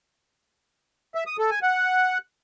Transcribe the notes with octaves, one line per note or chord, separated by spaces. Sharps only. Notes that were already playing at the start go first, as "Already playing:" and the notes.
E5
D#6
A4
G#5
F#5